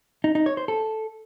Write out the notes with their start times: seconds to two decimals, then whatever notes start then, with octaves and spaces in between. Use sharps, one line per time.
0.24 D#4
0.35 D#4
0.46 C#5
0.57 C5
0.68 A4